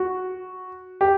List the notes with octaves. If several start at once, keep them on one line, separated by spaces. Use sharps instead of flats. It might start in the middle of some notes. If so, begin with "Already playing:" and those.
Already playing: F#4
G4